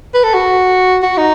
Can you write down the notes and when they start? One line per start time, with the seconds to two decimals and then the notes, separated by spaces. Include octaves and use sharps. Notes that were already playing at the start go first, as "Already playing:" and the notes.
0.14 B4
0.24 A4
0.34 F#4
1.03 F#4
1.18 D#4